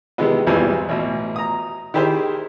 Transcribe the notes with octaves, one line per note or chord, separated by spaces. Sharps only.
C3 D#3 E3 G#3 B3
G#1 E2 B2 E3 G3 C4
A1 B2
A#5 D#6
D#3 E4 G4 G#4 C5